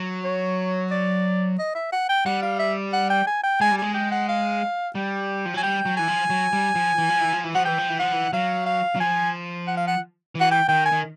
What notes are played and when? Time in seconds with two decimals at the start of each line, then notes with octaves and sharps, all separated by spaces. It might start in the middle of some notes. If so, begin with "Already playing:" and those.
Already playing: F#3
0.24 C#5
0.91 D5
1.59 D#5
1.75 E5
1.92 F#5
2.09 G5
2.26 G3 F#5
2.43 F5
2.59 E5
2.93 F#5
3.10 G5
3.27 G#5
3.44 G5
3.61 G#3 G#5
3.71 G3
3.78 G#3 G#5
3.94 G5
4.12 F#5
4.29 F5
4.95 G3 G5
5.46 F3
5.54 F#3 G#5
5.63 G3 G5
5.86 F#3
5.97 E3 G#5
6.08 F3
6.30 F#3
6.53 G3
6.75 F3
6.98 E3
7.09 F3
7.20 E3
7.33 F3
7.44 E3
7.55 F3 F#5
7.65 E3 G5
7.78 F3
7.89 E3
7.99 F3 F#5
8.12 E3
8.33 F#3 F5
8.66 F5
8.96 F#3
9.00 F3 G#5
9.68 F#5
9.77 F5
9.87 F#5
10.35 E3
10.40 F#5
10.51 G5
10.69 D#3 G5
10.86 G#5
10.92 D#3